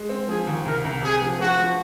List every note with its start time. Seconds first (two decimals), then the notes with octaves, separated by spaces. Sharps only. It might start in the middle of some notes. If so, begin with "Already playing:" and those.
Already playing: G#3
0.09 C4
0.28 F3 G#4
0.47 D#2
0.65 C2 A#4
0.84 C2
1.02 C3 G#4
1.21 F3
1.39 F3 F#4
1.59 F3